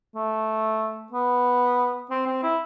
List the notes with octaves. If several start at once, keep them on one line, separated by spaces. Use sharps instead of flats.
A3
B3
C4
C4
E4